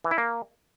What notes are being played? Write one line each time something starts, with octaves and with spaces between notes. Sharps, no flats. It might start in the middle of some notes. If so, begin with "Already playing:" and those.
E3
E4
A#3